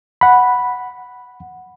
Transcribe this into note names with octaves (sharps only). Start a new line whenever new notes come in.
F#5 B5